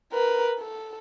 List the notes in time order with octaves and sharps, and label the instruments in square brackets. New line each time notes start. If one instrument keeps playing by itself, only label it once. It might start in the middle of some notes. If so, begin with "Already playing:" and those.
[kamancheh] A#4 B4
A4